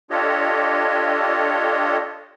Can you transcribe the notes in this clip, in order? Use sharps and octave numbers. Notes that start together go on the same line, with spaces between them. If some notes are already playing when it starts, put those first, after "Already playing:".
D4 F4 G4 A4 C#5 D#5